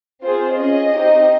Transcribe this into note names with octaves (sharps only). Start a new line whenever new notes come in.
C4 F4 G#4 C5
C#4 G#4 D#5
C4 D#4 G4